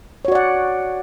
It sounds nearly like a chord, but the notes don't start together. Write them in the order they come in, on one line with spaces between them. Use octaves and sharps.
C#5 F#4 D5 F#5